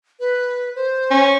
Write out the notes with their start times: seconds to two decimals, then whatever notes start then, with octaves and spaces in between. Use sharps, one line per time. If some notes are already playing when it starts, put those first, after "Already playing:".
0.20 B4
0.75 C5
1.11 C#4